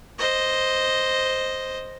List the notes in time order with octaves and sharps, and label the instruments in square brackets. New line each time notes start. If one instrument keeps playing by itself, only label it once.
[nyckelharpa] C5 D#5